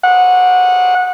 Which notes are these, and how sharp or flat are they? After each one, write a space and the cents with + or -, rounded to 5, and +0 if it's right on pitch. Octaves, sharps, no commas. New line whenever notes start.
F#5 -20